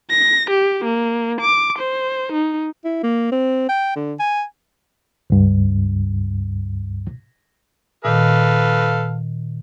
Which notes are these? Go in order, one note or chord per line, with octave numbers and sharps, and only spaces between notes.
A#6
G4
A#3
D6
C5
D#4
E4
A#3
C4
G5
D3
G#5
C#2 G2
A#2 D#3 A4 B4 F5